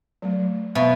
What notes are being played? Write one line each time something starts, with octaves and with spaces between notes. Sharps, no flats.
F#3 A3
B2 E5 F5